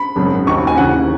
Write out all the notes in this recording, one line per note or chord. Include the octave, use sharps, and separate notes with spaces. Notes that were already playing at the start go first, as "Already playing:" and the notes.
Already playing: B5
G#1 F#2 C#3
D#2 D#3 F#3 C#6
G#5
D#2 C#3 E3 F#5